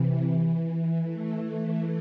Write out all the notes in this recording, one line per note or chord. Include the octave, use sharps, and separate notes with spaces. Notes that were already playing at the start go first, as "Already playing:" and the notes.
Already playing: C3 E3
A3